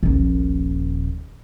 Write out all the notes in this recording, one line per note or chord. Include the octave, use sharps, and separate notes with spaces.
D#1 A#1